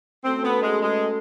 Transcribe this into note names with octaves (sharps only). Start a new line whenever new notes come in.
A3 C4 C#4 F#4 A4
B3
G#3
G#3